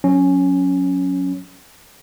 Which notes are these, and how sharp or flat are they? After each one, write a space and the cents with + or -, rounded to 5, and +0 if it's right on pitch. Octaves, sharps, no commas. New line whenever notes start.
F#3 -20 C#4 +0